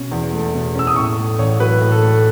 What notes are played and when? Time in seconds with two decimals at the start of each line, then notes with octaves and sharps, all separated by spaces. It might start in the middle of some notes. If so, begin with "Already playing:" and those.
Already playing: B2 C#4
0.11 E2
0.33 A3
0.54 B2
0.75 C#4 E6
0.87 D#6
0.96 A2 C#6
1.18 A3
1.39 A1 C#5
1.60 F#3 B4
1.81 A2
1.92 A4
2.03 A3